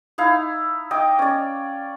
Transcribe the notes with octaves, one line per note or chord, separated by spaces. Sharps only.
D#4 E4 F5 A#5
D#5 G5 D6
C#4 D5